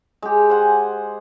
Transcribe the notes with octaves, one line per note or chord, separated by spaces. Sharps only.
G#3 G4
C5 F#5 G#5